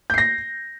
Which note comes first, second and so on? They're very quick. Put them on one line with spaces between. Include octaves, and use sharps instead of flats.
G6 C7 A#6